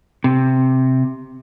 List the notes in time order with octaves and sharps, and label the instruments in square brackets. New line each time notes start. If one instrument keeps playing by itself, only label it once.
[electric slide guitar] C3